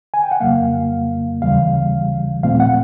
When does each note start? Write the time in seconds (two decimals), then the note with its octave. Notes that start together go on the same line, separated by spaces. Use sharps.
0.14 G#5
0.23 G5
0.31 F#5
0.40 F2 C#3 F#3 A#3 F5
1.42 D#2 C#3 E3 G3 F5
2.43 A#2 F3 A3 C4 F5
2.60 F#5